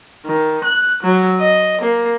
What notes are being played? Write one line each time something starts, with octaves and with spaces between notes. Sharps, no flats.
D#3
F#6
F#3
D#5
A#3